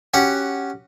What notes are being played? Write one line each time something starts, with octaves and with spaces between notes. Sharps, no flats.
C#4 F#4 G4 F#5